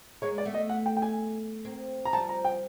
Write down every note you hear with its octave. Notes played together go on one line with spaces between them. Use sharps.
G#3 A#3 C#5
D5
A3 B3
D#5
F#5
G5
G5
G#5
A#3 C4
A#5
F3 G3 A5
A#5
G5